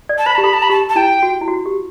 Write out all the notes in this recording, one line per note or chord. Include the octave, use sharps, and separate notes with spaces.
D5
A5
C5 B5
G4 A5
A4 B5
A5
B5
G4 A5
A5
E4 G5
F#4
E4
F#4
G4